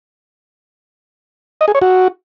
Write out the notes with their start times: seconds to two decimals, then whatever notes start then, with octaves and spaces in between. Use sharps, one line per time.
1.61 D#5
1.68 G#4
1.75 C#5
1.82 F#4